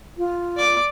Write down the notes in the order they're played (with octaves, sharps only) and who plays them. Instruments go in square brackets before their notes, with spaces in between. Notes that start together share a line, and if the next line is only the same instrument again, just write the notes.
[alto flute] F4
[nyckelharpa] D5 D6